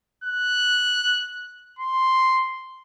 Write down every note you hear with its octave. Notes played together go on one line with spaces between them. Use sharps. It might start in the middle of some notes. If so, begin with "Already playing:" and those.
F#6
C6